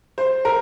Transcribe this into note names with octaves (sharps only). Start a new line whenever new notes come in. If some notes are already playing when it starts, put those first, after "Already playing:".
C5
A#4